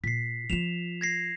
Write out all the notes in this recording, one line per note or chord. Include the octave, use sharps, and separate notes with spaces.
A#2 B6 C7
F3 F4 E7 F7
G#6 A#6 C7